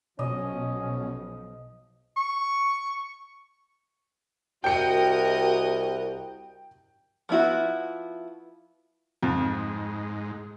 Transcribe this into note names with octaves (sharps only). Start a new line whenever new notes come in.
B1 B2 F3 C#4 D#5
C#6
C2 F#4 A#4 D#5 G5 C#7
F3 B3 E4 F#4
F2 G#2